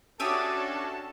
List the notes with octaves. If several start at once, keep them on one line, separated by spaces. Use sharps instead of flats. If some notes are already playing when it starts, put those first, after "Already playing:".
C#4 D4 F#4 G4 A4 E5 A5 D#6